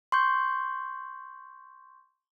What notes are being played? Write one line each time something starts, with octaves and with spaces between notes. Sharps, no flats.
C6 C#6 G6